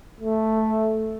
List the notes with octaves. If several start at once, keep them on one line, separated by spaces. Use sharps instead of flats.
A3